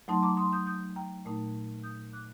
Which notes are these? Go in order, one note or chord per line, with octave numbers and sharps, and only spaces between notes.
F#3 A3 D#4 A5 C6
A#5 D6
C6 D#6
D#6 G6
D#6 G6
G5 A#5
A#2 A3 D#4
D#6 G6
D6 F#6